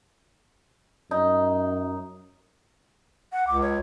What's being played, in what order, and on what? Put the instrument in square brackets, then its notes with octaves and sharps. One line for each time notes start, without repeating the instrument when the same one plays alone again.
[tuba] F#2 [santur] D#4
[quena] F#5
[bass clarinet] C#2 [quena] D6
[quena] C#5